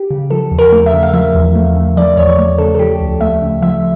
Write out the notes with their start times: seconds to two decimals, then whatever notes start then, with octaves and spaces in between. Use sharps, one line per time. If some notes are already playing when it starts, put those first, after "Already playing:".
Already playing: G4
0.10 C#3
0.30 F3 A4
0.51 E2
0.59 A#4
0.72 A3
0.86 E5
0.93 C#3
1.03 F5
1.14 F3 E5
1.34 E2
1.55 A3
1.76 C#3
1.97 F3 D5
2.17 E2 C#5
2.38 A3
2.58 C#3 A4
2.75 A4
2.79 F3 G4
3.00 D2
3.21 A3 E5
3.42 C#3
3.62 F3 E5